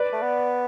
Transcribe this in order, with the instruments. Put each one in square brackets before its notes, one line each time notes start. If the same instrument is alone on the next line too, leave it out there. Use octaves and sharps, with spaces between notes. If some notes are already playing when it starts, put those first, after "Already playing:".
Already playing: [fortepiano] B4 D5
[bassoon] A3
B3